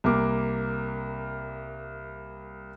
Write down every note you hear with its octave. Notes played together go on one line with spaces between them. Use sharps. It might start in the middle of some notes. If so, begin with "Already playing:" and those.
C2 A#3 D6